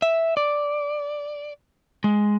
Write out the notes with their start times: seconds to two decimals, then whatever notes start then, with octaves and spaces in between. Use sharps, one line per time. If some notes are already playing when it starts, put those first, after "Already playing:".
0.02 E5
0.37 D5
2.04 G#3